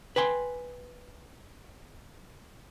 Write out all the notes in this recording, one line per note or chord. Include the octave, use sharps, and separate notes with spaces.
B4 G5 G#5 C6